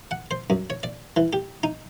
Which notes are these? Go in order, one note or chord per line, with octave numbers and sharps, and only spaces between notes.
F#5
C5
F#2
C#5
D5
E3
G4
D#4